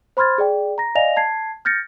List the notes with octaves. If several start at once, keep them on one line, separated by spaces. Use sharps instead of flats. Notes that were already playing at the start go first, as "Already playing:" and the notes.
C5 B5 C6 F6 G#6 A6
G#4 D5 G5
A#5 A#6
D5 D#5 F5 G#5 A#6 F7
A5 G#6 C7
F6 G6 A6 A#6 C#7